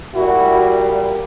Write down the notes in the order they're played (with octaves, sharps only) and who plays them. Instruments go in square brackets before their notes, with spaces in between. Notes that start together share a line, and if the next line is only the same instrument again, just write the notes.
[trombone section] A#2 G3 E4 F#4